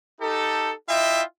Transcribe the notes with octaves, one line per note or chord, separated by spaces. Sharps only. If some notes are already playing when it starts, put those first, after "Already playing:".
D#4 G4 A4
E4 F4 D#5 E5 G5